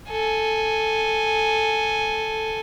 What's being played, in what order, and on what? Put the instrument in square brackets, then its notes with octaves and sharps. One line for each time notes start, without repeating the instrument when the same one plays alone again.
[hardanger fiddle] A4 G#5